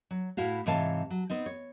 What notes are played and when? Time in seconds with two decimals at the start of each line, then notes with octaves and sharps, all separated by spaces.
0.11 F#3
0.37 A2 E4 F#4 F5
0.66 G#2 C3 E3 C#5 F5 A5
1.10 F#3
1.30 B3 C4 D#4
1.46 C#5